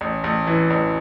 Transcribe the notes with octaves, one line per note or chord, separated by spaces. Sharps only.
A1
A1
E3
A1